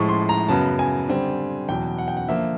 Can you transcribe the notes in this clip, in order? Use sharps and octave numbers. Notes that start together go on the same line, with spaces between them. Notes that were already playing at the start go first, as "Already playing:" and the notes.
Already playing: A2 F3 G#3 C#6
C6
A#5
F#2 C#3 F#3 B3 A5
G#5
D3 G3 C4
E2 B2 F#3 G5
F#5
G5
F#5
D3 F3 A#3 E5